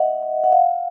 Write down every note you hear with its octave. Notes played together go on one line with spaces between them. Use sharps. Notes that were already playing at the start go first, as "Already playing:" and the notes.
Already playing: D#5 E5 F#5
F#5
F#5
F5